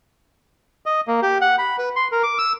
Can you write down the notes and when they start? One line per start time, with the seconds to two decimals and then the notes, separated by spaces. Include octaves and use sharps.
0.86 D#5
1.08 A#3
1.22 G4
1.41 F#5
1.58 B5
1.78 B4
1.96 C6
2.12 A#4
2.23 D6
2.38 E6